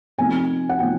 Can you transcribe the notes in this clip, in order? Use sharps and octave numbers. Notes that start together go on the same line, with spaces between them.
C3 F3 A3 C4 D#4 G#5
F#5
C3 F3 A3 C4 D#4 G5